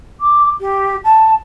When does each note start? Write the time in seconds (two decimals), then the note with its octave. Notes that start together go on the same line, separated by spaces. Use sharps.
0.21 D6
0.61 G4
1.04 A5